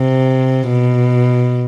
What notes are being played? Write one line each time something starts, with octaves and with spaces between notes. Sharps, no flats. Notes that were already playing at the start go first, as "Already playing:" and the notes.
Already playing: C3
B2